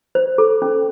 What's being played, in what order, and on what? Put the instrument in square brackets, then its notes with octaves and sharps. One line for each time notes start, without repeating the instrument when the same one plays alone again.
[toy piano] C5
A4
C#4